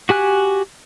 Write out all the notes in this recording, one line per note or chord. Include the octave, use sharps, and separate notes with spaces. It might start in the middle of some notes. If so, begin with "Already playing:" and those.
F#4 G4 G#5 F#6